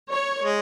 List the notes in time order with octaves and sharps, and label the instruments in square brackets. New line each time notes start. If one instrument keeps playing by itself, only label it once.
[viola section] C#5
[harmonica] G#3